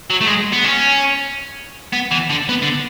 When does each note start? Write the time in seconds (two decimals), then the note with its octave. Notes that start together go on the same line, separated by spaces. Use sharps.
0.10 F#3
0.21 A3
0.27 G#3
0.52 B3
0.64 C#4
1.93 B3
2.11 E3
2.30 D3
2.49 B3
2.62 D3